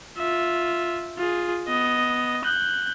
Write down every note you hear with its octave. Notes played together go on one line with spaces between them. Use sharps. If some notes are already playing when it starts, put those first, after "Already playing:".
F4 E5
F4 G#4
B3 D#5
F#6 G6